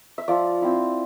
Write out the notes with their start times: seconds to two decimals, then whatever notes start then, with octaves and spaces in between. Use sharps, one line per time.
0.18 E5
0.28 F3 D5
0.62 C4 E4